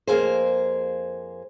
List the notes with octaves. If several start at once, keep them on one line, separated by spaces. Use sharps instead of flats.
F2 A#3 F4 G#4 C5